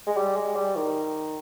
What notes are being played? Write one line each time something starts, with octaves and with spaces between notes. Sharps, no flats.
G#3
G3
G#3
G3
D#3